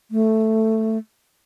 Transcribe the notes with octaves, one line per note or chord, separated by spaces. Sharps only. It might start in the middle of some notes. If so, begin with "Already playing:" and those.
A3